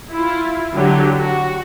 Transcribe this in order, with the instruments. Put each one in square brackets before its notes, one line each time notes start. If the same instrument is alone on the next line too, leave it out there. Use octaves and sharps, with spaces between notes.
[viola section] E4 F4
D3 F#3 G4
F#4